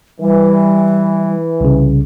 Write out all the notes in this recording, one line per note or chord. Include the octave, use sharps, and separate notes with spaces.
E3 G3
C2 C#3